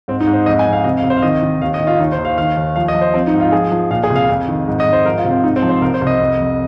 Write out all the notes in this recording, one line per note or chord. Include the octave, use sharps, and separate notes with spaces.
G#2 C4
D#4
G#2
C5
F2 D#5
G#5
F2
F5
C3 D#5
F5
C2
C5
F5
D#3 D#5
D#3
D#2 F5
D#5
D#3
F4
D#2 D#4
C5
D#2
F5
D#3 F5
D#2
F3 F5
D#5
F3
C5
F3 C4
D#4
G#2
F4
F3 G#4
F3
A#2 F5
G#4
C2
F5
F2
D#3
G#2
D#5
G#2
C5
F3 A#4
F4
C3
C4
G#2 D#4
C4
F3
C5
C2 A#4
C5
C2
D#5
F2
F2